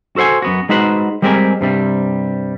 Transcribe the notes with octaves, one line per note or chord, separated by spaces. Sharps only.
F#4 A4 C5 F#5 G#5
F#2 B3 F#4
G#3 D#4 F#4 B4 C5 F#5
G3 G#3 C4 G4 A#4 G#5
G2 C3 G3